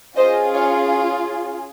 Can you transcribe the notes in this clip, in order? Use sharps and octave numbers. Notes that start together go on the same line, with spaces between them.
C#4 F4 G#4 C5 D#5
C#5 F5